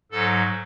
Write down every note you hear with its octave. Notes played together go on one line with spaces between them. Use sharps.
G#2 F#3 A4